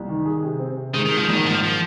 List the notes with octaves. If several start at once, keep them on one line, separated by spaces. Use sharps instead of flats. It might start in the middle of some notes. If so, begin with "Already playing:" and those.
Already playing: C2
D#3
G#4
C3
C4
C3
D#3 G#3
D#3
G#3
F3
G#1 D#3
G#1 F3
F3